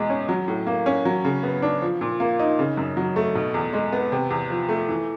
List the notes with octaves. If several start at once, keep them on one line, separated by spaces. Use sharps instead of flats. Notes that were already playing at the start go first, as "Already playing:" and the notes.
Already playing: E2 B2 G#3
C#4
F#3
A2
A#3
C#4
F#3
C#3
B3
D4
F3
A#2
A#3
D#4
C#3
F#2
F#3
A3
B2
E2
G#3
B3
C3
E2
F3
A3
E3